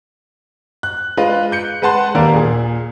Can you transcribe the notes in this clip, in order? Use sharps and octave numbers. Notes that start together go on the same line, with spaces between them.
F#6
G#3 F4 B4 D#5
F#6 G6 C#7
G#3 B4 F#5 A5 C6
D#2 A#3 A#4 D5 F5
A#2 G#4